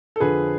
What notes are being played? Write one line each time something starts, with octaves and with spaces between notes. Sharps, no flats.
A4
F2 D3 F3 G#4 B4